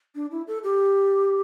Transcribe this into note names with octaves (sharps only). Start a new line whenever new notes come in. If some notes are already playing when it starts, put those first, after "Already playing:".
D4
E4
A4
G4